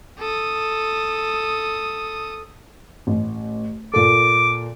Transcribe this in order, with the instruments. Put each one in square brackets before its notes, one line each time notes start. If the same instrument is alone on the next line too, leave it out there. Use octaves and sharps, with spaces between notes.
[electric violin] A4 D#6
[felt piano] A1
[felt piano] A#2 A4 [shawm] D6